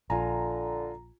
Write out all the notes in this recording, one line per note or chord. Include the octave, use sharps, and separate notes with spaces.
A#1 D3 F4 G#5 A#5